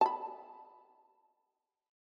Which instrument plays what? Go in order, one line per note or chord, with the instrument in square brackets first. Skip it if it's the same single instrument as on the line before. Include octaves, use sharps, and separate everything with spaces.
[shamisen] A5 B5